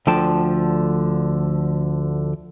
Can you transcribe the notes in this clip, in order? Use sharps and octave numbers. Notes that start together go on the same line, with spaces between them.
D2 D3 F3 G5 A5